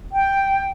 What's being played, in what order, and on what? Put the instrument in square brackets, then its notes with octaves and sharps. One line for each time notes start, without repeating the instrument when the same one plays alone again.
[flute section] G5